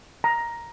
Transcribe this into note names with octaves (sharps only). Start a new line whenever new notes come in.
A#5